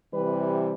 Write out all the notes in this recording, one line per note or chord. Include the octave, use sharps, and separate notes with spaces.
C3 E3 G3 B4